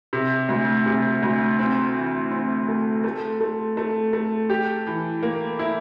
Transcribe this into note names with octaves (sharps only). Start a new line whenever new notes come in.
C3
D2
C3
D2
C4
E3
C4
A3
A3
A3
A3
A3
G4
E3
A#3
E4